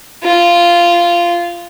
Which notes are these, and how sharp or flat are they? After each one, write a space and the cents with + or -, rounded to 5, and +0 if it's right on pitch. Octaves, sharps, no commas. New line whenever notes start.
F4 -10